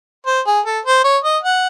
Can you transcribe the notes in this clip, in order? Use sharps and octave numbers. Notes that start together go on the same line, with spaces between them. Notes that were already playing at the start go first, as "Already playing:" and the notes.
C5
G#4
A4
C5
C#5
D#5
F#5